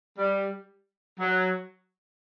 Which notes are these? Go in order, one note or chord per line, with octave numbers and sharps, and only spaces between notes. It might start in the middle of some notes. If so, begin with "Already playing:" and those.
G3
F#3